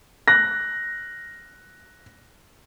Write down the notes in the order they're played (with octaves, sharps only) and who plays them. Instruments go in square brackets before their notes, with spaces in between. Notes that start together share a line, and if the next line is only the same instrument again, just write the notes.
[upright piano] F#6 A#6